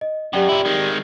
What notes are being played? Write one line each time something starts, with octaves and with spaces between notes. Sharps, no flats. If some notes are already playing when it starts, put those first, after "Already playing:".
D#5
F#2 G4 D5 G5
A#2 E4
D#3 G#3